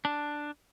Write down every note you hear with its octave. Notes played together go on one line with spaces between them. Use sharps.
D4